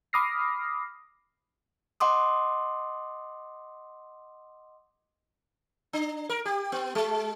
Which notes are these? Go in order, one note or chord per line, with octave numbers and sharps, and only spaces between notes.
B5 D6 D#6 F6 A#6 C7
D#5 F#5 C6 D6 D#6
D4
A#4
G4
B3
G#3